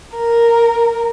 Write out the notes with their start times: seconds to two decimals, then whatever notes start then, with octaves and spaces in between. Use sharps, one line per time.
0.16 A#4